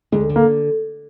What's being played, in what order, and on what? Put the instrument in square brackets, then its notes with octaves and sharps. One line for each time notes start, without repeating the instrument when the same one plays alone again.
[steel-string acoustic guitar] D2 [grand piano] G#3
[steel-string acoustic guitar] D3
[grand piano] A#3